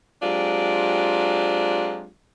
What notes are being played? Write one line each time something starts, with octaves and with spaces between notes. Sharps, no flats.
F#3 G#3 C4 D4 F4 G4